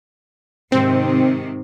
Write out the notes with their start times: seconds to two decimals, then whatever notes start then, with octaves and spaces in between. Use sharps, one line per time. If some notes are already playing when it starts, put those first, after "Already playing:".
0.72 G#2 C3 D#3 C4